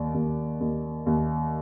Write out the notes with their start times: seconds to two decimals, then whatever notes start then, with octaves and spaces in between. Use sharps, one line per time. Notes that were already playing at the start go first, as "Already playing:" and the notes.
Already playing: D#2 D5
0.14 D#2
0.60 D#2
1.06 D#2